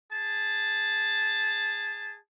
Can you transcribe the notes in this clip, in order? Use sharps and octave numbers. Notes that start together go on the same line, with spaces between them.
G#4 A5